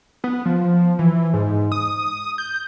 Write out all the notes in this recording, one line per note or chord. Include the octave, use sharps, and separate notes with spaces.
B3
F3
E3
G#2
D#6
G6